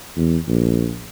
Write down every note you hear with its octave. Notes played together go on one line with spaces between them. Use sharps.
E2
A#1